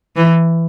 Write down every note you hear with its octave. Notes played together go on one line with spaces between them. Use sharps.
E3